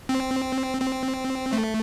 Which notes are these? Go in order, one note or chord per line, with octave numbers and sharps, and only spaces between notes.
C4
C4
A3